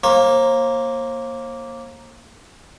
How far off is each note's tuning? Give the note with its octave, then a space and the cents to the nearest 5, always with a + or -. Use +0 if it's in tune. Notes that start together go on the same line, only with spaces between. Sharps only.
A#3 +0 C5 +45